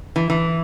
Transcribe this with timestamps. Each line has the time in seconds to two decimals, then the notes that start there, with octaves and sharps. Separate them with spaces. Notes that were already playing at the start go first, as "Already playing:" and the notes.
0.16 E3
0.30 E3